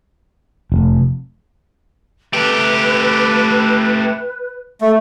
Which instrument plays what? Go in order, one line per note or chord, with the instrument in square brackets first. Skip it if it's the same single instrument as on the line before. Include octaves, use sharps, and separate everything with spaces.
[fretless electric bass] F1
[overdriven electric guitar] A3 G4 [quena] B4
[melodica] A3